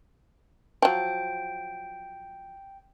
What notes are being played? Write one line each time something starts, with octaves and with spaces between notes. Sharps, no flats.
F3 F#3 G5